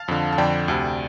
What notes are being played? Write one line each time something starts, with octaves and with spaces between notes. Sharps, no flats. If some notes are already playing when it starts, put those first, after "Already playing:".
Already playing: F5 A5
F2 D3
A5
F2 D3 D5 G5
D2 C3